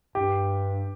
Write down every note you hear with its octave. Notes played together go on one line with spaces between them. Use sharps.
G2 G4